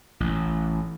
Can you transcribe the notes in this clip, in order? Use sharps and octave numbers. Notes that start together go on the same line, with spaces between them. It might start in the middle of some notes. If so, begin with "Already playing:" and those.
A1